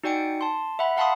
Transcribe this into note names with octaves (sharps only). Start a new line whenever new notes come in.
D#4 F#4 D5 G5 G#5 C#7
A5 C6
E5 F#5 B5
F5 F#5 A5 B5 C6 D#6